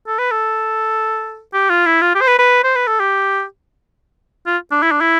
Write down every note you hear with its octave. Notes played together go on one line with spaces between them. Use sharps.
A4
B4
A4
G4
F4
E4
F4
G4
C5
B4
B4
C5
B4
A4
G4
F4
D4
E4
D4
E4